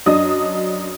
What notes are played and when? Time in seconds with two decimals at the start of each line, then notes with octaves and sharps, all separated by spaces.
0.06 F#2 D4 D#5 D#6